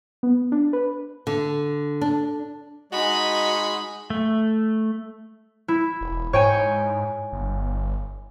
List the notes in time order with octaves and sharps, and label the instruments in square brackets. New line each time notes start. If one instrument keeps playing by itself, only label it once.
[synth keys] B3
D4
B4
[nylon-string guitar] D3
D4
[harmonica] G#3 [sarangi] D#4 [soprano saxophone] F#4 [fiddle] B5
[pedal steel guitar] A3
[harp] E4
[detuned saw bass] E1
[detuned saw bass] G#2 [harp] C#5 G5 G#5
[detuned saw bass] G1